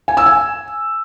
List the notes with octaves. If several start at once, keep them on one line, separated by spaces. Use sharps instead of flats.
G#5
E6
G#5